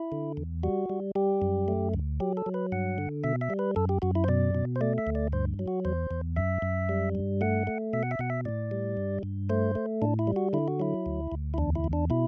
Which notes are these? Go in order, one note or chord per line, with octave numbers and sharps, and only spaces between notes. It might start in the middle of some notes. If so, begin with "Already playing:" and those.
Already playing: E4
D3
E2
G3 F#4
G3
G3 G4
F#2
A3
D2
F#3 G4
A4
F#3
B4
G2 F#5
D3
B2 E5
E5
G3
B4
F#2 A4
G4
F#2 F#4
E4
C5
B2 D5
B2
C5
A3 D5
E5
D2
D5
G2 C5
F#3
F#4
E2 C5
E2
F#2 E5
F#2
G3
G2
A3 F#5
A3
B2 E5
F#5
E5
B2 F#5
E5
A2 D5
G3
G2
G2
A3 C5
A3
A2 D4
E4
G3
F#4
D3 E4
F#4
F#3 E4
D2
D2
E4
E2 D4
E4
E2
D4
B2 E4